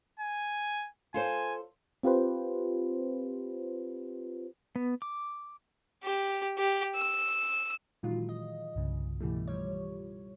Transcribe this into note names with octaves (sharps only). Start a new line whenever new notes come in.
G#5
F4 A4 C5 G#5
C4 F4 G4 B4 C5
B3
D6
G4
G4
E6
A#2 D#3 E3 F#3 G#3 F4
D#5
C2 G2 C#3
G2 B2 E3 G3 A3
F3 G3 C#5